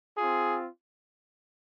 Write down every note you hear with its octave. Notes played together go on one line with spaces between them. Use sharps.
C4 F4 G#4